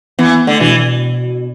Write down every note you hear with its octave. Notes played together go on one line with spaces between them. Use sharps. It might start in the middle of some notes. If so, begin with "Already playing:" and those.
E3 B3
B3
D3 A3
B2 E3